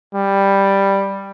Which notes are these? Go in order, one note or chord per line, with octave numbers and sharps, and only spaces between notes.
G3